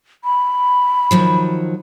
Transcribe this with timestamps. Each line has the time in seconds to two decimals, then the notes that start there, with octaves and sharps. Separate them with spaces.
0.24 B5
1.11 D#3 F3 F#3